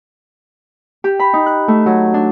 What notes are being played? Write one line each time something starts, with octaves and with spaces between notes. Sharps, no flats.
G4
B5
D#4
F#6
A3
F#3
D4